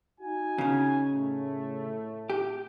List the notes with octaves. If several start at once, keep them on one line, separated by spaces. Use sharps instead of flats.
D#4 F#4 G#5
C#3 C#4
A2 A3
G4